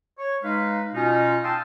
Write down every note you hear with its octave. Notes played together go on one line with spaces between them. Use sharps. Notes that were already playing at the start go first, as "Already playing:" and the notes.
C#5
G#3 D#4 B4 F5
B2 C#4 D#4 F4
F5 G5 A5 C6 D#6 E6